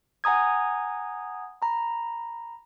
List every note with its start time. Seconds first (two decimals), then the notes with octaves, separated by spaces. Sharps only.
0.24 F#5 G#5 A#5 D#6 G#6
1.62 A#5 B5